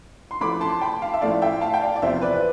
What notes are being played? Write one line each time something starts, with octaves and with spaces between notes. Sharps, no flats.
C6
A1 A2 F3 A3 B5 D6
A5 C6
G5 B5
F5 A5
E5
A1 A2 F3 A3 D5 F5
E5 G5
F5 A5
G5
D5 F5
D5
E2 C3 F3 C5 E5
B4 D5